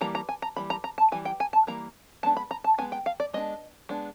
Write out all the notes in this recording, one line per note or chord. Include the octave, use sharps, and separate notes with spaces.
E3 G3 A#3 A#5
A#5
G#5
A#5
E3 G3 A#3 B5
A#5
A#5
A5
E3 G3 G#5
G5
G#5
A5
E3 G3 A#3 A#5
G#3 B3 D4 A5
B5
A#5
A5
G#3 B3 D4 G#5
G5
F5
D5
G#3 B3 D4 D#5
G#3 B3 D4